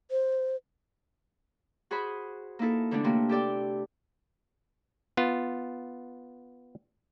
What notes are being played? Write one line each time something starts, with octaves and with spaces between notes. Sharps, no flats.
C5
F#4 G#4 C5 B5
A#3 D#4 E4 A4
D3 E3 A3 B3 D4
C3 A3 A#3
G4 A4 D5 G5
B3 F4